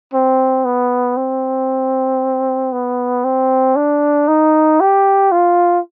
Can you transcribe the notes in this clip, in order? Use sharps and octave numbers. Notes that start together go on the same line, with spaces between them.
C4
B3
C4
B3
C4
D4
D#4
G4
F4